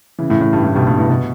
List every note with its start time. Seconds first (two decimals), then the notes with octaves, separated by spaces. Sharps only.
0.19 C#3 E3
0.30 A2 C#3
0.41 A2
0.53 G2
0.64 A2
0.75 G2 B2
0.87 G2 B2
0.98 A2
1.10 B2